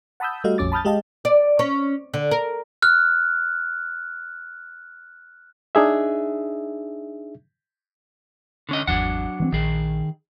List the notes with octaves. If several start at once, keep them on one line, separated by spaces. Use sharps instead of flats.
F#5 A5 B5 D#6 E6 G6
G3 A3 F#4 D#5 F5
A#1 F2 C#4 D6 A6
A5 B5 D#6 F6 G6 A6
G#3 G4 D#5 F5 A5
D5
C#4
D3
A#4
F6 F#6
D4 D#4 G#4 E5
D3 C#4 D#5
G#1 E2 F#3 D4 F#5
E3 G#3 C4
A#1 D#3 G#4